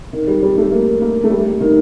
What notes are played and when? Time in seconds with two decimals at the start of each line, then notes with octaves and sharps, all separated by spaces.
0.13 D#3
0.28 G3
0.43 G3
0.58 A3
0.71 A#3
1.01 A#3
1.24 A3
1.30 G3
1.60 D#3